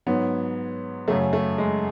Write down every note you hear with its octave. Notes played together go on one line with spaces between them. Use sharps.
G#2 F#3 B3
F#2 C#3 F#3 A3
A3
G#3